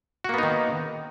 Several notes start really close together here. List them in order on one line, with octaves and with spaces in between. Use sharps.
F#4 A#3 B3 D#4 D#3